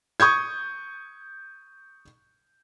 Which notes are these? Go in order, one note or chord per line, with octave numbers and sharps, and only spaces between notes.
C#6 D#6 G6 G#6